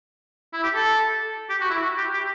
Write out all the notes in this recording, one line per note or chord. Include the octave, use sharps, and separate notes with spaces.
E4
G4
A4
G4
F#4
E4
F#4
G4
G4